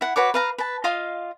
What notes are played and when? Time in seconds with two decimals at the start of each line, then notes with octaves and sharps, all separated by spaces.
0.01 E4 F#5
0.16 F#4 B4 C#5 D6
0.34 B4 F5 A#5
0.58 B4 A5
0.84 F4 D#5 F5 C6